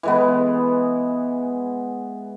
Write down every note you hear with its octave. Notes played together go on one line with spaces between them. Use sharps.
E3 G#3 B3